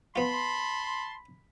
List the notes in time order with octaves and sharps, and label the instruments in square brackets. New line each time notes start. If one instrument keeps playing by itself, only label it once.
[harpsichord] B3 F4 [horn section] A5 C6 [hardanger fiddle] B5